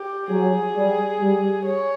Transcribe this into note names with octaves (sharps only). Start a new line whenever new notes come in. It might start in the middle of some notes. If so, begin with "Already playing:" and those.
Already playing: G4
F#3 G#4
G3
G3
C#5